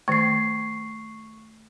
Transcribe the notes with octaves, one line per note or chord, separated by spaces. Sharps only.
D#3 A3 C#6 C7